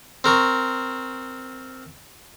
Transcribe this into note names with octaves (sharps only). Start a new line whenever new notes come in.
C4 A#4 C#6